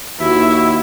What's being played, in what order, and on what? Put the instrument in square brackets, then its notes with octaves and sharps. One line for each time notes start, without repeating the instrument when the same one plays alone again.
[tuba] D#2 [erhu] E4 [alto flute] F#4 [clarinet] E5